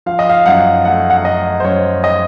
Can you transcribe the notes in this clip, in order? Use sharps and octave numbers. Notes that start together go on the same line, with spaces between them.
F3 F5
D#5
F5
F#2 F#5
A3 F#5
F#5
A3 D#5
C5
F#2 C#5
D#5